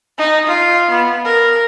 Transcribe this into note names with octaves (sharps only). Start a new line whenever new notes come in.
D#4
F4
B3
A#4